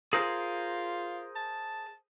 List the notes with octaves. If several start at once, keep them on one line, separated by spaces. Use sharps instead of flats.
F4 G#4 A#4 C5
A5